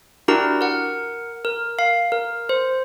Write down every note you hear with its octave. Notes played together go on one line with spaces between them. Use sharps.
D4 E4 F#4 G4 A#4 A#5
A#4 F#5
A#4
F5
A#4
C5